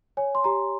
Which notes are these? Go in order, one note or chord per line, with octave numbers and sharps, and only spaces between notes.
C#5 G#5
C6
G4 A#5